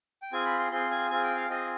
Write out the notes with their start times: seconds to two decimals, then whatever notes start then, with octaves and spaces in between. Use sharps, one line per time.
0.22 G5
0.33 C4 F4 G#4 G#5
0.46 B5
0.59 C6
0.72 C4 F4 G#4 C6
0.91 G#5
1.10 C4 F4 G#4 G#5
1.24 G5
1.37 F5
1.50 C4 F4 G#4 D#5